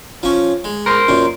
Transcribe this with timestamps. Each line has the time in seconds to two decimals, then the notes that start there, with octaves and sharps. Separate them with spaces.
0.23 F3 C#4
0.64 G#3
0.86 A#4 C5
1.08 F#2 A#2